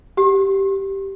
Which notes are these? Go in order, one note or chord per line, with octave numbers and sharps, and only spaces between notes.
G4